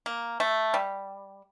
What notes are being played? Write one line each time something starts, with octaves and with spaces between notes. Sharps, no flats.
A#3
A3
G3